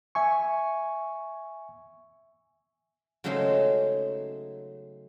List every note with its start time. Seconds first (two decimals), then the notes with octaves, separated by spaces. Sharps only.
0.15 E5 G#5 C#6
3.24 C#3 F#3 G#3 A3 D#4 C5